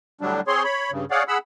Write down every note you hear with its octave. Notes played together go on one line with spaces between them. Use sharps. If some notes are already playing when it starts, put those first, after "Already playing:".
A2 D3 F#3 G3 D4
C4 G#4 C#5 C6
C#5 B5
G2 C#3
G#4 C#5 D5 F5 F#5
G#4 F#5 B5 E6